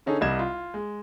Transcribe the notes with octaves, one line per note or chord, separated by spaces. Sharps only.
D3 C#4 D#4 G#4 A4
C2 G3 D#5 G#6 E7
F4
G#3